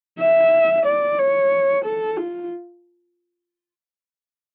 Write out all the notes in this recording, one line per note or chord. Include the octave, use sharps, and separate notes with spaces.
E5
D5
C#5
A4
F4